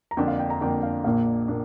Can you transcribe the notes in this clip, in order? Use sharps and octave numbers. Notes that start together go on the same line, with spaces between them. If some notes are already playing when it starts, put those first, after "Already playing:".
A#5
F2 D3 A#3 D4 G5
F5
G5
A#5
F2 D3 A#3 D4 G5
F5
A#1 A#2 A#3 D4 F5
A#2 A#3 D4